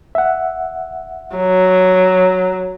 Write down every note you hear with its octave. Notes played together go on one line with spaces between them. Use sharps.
E5 F#5
F#3